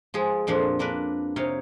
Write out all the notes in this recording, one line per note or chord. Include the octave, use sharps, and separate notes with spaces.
F3 G#3 G#4
F2 A#2 F3 D4
A#3 D4 A#4 B4
C3 D#4 C#5 F5